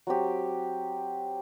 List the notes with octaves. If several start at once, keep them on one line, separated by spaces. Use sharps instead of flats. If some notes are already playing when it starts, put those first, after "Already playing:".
F#3 C4 G4